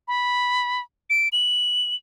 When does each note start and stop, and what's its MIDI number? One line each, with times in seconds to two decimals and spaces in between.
0.08 0.81 83
1.10 1.28 98
1.33 1.95 102